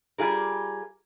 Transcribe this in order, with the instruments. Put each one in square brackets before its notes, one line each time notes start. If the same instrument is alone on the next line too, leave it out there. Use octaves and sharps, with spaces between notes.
[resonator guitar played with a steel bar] G3 F4 G#4 A#4